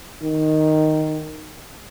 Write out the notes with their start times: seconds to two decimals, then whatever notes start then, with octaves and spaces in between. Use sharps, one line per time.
0.22 D#3